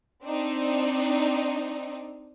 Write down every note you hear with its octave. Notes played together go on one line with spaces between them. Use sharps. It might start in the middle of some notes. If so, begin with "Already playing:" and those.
C4 D4 D#4